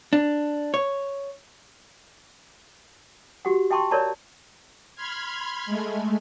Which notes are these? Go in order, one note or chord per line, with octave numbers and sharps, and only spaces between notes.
D4
C#5
F#4 G4 F#5
E5 G5 A5 C6 C#6
A#4 C#5 D5 E5 A5 A#5
B5 C6 F6 G#6
G#3 A3